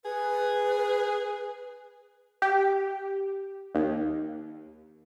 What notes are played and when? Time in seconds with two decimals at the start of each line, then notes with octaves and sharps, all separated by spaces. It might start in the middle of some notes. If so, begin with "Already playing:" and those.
0.05 G#4 B4
2.42 G4
3.75 D#2